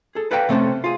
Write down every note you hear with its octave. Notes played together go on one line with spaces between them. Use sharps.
G#4 A4
A4 B4 D5 F5 G5 A#5
C3 A3 C4 C#4 A4
F4 G#4